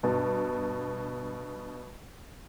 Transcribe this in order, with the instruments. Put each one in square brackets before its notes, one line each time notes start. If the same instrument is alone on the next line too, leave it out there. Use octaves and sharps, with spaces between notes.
[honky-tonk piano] G2 B2